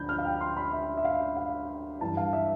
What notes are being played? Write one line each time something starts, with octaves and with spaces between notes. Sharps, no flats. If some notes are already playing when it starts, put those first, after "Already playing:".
Already playing: D2 D3 F3 B5 G6
F6
F5
G5
C6
B5
E5
E5
F5
F5
G1 G2 E3 A5
F5
E5